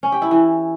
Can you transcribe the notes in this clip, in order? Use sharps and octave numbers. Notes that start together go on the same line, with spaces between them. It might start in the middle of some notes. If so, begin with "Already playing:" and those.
C#4
G4
E4
E3